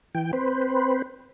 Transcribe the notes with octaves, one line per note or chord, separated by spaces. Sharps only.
E3 G5
C4 B4 C5